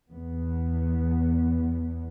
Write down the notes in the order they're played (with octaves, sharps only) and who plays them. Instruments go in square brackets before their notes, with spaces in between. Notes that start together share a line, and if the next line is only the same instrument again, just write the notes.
[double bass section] E2 B3